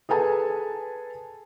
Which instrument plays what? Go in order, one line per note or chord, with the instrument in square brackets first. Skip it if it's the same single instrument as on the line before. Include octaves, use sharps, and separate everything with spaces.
[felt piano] G#4 A4 B4 G#5 A5